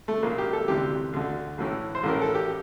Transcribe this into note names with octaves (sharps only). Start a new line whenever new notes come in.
A3
A#1 A#2 A#3
G4
A4
D2 C3 E3 G4
D2 D3
A1 A2 E3
C5
A1 A2 E3 A#4
A4
G4